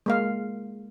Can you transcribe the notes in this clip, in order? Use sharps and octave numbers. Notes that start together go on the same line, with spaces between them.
G#3 A#3 F5